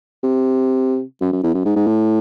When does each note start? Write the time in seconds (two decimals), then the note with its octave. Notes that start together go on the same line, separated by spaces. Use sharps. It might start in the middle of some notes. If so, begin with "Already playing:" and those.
0.23 C3
1.21 F#2
1.33 F#2
1.43 E2
1.54 F#2
1.65 G#2
1.76 G#2
1.87 A2